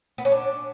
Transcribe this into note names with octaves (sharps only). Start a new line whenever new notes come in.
B3
C#4
D4